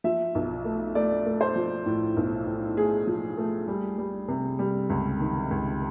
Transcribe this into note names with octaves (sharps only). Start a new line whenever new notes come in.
F3 E5
B1
A3
A3 D5
A3
C5
F3
A2
B1
A2
A3 G#4
F3
A3
G3
G3
C3
G3
C#2
D#3
C#2